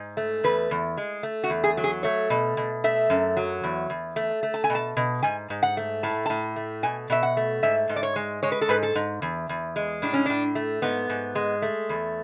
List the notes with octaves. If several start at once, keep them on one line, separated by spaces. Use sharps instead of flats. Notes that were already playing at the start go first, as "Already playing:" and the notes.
Already playing: G#2
A3
E2 B4
E2
G#3
A3
F#4
E2
G#4
F#3
G#4
A3 C#5
B2
B2
A3 E5
F#2
F#3
E2
E2
A3
A3
A5
G#5
B2
A5
B2
G#2 G#5
G#2
F#5
A3
A2 A5
A2 A5
A3
B2 G#5
B2 E5
F#5
A3
G#2 E5
G#2
D5
C#5
G#3
G#3 C#5
B4
A4
G#2 B4
A4
G#2
E2
E2
G#3
A2 D4
C#4
A2 D4
A3
G#2 B3
G#2
G#3
A3
E2